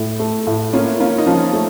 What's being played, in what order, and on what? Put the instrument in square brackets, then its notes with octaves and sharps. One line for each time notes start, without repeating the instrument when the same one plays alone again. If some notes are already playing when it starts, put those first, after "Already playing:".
Already playing: [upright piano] A2
A3
A2
[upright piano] A#3 [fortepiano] C#4 F4
[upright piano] A#3 [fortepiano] C#4 F4
[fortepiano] D#4
[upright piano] F3 [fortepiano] C#4 F4
[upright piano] A3